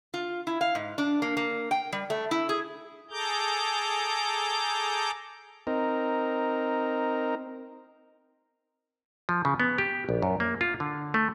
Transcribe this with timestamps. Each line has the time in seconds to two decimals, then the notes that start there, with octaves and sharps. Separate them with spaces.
0.14 F4
0.47 E4
0.61 F5
0.75 G#2
0.98 D4
1.22 A#3
1.37 A#3
1.71 G5
1.92 G3
2.10 A3
2.31 E4
2.49 G#4
3.11 G#4 A4 A#5 D6 G6
5.67 C4 D#4 A#4
9.29 F3
9.45 C#3
9.60 B3
9.78 G4
10.09 A#1
10.22 F#2
10.40 A#3
10.61 F4
10.80 D3
11.14 A3